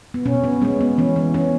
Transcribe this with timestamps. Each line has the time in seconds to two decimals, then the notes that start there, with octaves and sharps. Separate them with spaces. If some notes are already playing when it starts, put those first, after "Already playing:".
0.14 B3
0.25 B2 C#4
0.44 B3
0.62 G#3 B3 C#4
0.81 B3
0.98 E3 C#4
1.16 B3
1.34 B3 C#4